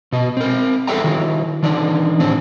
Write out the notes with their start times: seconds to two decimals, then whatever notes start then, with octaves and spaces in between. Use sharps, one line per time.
0.12 B2 D#5
0.37 C4 A#4
0.87 G#4 A4 D5 E5 G5 A#5
1.04 D#3 F#3 E4
1.63 D#3 E3 D4 D#4 D5
2.20 A2 E3 C4 D4